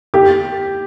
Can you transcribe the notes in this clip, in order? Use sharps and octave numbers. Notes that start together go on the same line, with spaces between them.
G4